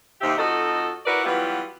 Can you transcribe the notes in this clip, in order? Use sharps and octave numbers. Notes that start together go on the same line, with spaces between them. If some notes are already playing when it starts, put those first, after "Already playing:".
D#2 C3 C4 G4 E5
F2 D#4 F#4 A4 D#5
E4 F#4 A#4 B4 D5
E3 F#3 G3 B3 F4